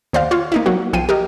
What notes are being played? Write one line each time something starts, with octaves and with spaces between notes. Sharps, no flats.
D#2 C5 D5 F5
F4 F#4 C#5 F5
A#3 D#4 E4
F#3 A#3 F#4
B1 F3 G5 C7 D#7
G4 A#4 D#5